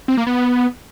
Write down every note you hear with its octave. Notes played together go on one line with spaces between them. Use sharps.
C4
A#3
B3